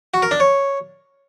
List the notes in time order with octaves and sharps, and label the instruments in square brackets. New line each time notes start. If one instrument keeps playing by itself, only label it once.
[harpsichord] F#4
A#4
D4
C#5